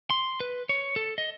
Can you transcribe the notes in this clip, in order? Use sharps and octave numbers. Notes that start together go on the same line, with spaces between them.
C6
B4
C#5
A4
D#5